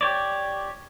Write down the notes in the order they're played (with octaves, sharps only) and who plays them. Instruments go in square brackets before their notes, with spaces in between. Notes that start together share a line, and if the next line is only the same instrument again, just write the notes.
[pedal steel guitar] G4 C#5 D5